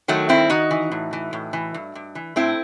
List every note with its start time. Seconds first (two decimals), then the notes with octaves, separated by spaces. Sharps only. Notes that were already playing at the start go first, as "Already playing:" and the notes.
0.08 D#3 F#3 A3
0.29 G2 C4 E4
0.50 D#3 D#4 F#4
0.71 E3
0.92 A2
1.13 E3
1.33 A2
1.53 E3
1.74 G2
1.95 G2
2.15 E3
2.36 A2 C4 E4